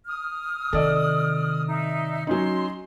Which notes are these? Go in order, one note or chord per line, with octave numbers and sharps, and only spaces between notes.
D#6 F6
C3 D#3 A4 D5 D#5
D#4 E5
F#3 C#4 D#4 C6